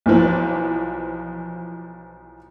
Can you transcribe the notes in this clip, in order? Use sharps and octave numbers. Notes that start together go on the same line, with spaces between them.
B1 E3 F3